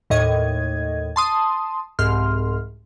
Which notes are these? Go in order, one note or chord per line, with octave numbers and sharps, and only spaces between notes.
D#2 A2 D#5 G#6
A5 C6 D#6
C2 G#2 C6 F6